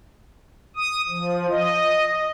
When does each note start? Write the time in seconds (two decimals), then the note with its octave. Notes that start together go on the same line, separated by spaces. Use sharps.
0.76 D#6
1.09 F3
1.49 D#5